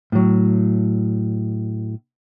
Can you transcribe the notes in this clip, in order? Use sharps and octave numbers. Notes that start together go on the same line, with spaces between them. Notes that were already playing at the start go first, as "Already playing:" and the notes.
A2 F#3